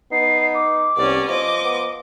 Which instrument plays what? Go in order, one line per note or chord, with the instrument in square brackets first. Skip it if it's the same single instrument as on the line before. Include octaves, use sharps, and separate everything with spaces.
[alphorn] B3 [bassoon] D#4 [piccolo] C7
[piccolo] D6
[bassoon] C2 [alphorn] B3 [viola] C#4 D5
[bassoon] F3 [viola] D#5 D6 [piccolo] C6
[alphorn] B3